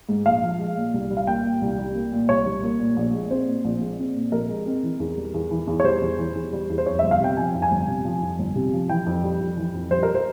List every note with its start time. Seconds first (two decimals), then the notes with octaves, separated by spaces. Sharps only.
0.09 G#2
0.26 A#1 F5
0.43 F3
0.59 G#3
0.76 A#2
0.94 C2
1.10 G3
1.17 F5
1.27 A#3 G5
1.44 A#2
1.61 C2
1.78 G3
1.95 A#3
2.12 A#2
2.29 C2 C#5
2.46 G3
2.63 A#3
2.79 A#2
2.97 A#1
3.14 G#3
3.30 C4 C5
3.48 A#2
3.65 A#1
3.81 G#3
3.98 C4
4.16 A#2
4.32 A#1 A#4
4.49 G#3
4.66 C4
4.83 E3
5.00 E2
5.17 G3
5.34 E2
5.51 E3
5.67 E2
5.80 C#5
5.84 G3 C5
6.02 E2
6.18 E3
6.35 E2
6.53 G3
6.70 E2
6.78 C5
6.86 F2 C#5
6.99 G1 E5
7.11 F5
7.20 C3 G5
7.37 F3 G#5
7.54 F2
7.62 G#5
7.71 G1
7.88 C3
8.05 F3
8.22 F2
8.39 G1
8.55 C3
8.73 F3
8.89 E3 G5
9.06 F2
9.24 G3
9.40 F2
9.57 E3
9.74 F2
9.91 G3 C5
10.03 A#4
10.15 C5